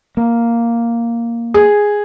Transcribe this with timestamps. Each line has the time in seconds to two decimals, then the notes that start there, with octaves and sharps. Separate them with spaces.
0.17 A#3
1.54 G#4